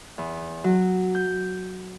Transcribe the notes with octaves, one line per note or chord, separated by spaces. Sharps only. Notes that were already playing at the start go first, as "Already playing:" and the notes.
E2
F#3
G6